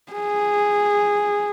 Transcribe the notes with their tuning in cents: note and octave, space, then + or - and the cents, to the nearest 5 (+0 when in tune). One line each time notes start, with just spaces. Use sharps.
G#4 -10